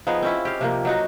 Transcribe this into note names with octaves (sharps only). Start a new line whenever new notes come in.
F3 B3 D#4 G#4
C4 C#4 E4
G4 D#5 F5
C3 F3 A#3
F#3 D#4 F#4